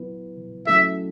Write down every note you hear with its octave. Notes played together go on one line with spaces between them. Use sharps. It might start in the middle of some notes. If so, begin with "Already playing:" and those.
Already playing: F#3 B3 E4 B4
F#3 A3 C#4 E4 A4 E5